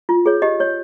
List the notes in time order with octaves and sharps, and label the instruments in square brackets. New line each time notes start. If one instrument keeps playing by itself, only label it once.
[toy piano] F4
G#4 C#5
G4 D#5
C#5